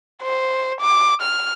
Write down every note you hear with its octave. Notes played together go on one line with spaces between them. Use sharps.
C5
D6
F6